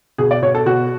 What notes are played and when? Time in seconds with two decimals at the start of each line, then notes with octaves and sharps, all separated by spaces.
0.18 B2 G#4
0.31 D5
0.42 B2 C#5
0.55 A4
0.66 B2 F#4